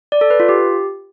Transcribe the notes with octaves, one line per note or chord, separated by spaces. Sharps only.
D5
A4
B4
F4
G4